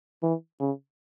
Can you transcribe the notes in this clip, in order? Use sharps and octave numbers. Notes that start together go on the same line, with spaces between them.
E3
C#3